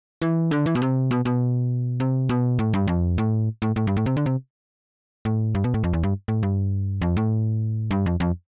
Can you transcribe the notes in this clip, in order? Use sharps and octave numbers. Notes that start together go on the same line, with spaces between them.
E3
D3
E3
B2
C3
B2
B2
C3
B2
A2
G2
F2
A2
A2
A2
G2
A2
C3
D3
C3
A2
G2
B2
A2
F2
E2
G2
A2
G2
F2
A2
G2
F2
F2